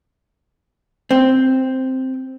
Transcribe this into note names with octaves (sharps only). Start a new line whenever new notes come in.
C4